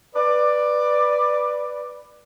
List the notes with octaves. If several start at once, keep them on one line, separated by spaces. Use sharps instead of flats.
B4 D5